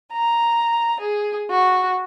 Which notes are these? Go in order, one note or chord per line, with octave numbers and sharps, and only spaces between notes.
A#5
G#4
F#4